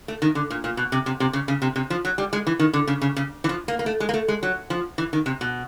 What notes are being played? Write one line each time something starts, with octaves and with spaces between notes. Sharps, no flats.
A3
D#3
D3
A#2
A#2
B2
C3
C3
C3
C#3
C#3
C3
C3
F3
F#3
G3
G#3
E3
D#3
D3
C#3
C#3
C#3
E3
F3
A#3
A#3
A3
G#3
A#3
A3
G#3
F#3
F3
E3
D#3
C3
B2